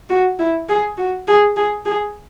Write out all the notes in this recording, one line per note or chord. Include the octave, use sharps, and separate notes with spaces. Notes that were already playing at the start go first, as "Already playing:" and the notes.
F#4
E4
G#4
F#4
G#4
G#4
G#4